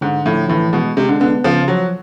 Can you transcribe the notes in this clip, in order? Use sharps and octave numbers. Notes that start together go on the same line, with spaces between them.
G#2 D3
A2 F3
A2 E3
B2 G#3
C3 G#3
D3
D3 B3
C#3 F3
F3 F#3